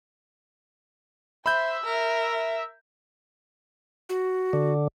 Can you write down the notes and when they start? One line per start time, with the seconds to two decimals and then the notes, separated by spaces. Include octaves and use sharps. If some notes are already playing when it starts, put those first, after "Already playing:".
1.46 C5 E5 B5 G6
1.84 A#4
4.09 F#4
4.53 D3